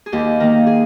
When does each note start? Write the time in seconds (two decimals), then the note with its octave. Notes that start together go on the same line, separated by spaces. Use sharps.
0.06 G#4
0.12 D#2 G4
0.40 D#3 A#3 A#4
0.67 G#4